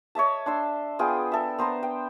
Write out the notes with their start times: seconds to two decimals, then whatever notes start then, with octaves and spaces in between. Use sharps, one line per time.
0.15 C#5 D#5 E5 A5
0.46 D4 C6 E6
0.99 B3 F4 G#4 G5
1.32 A4 E5
1.59 B3 C5 A#5 C6
1.83 G5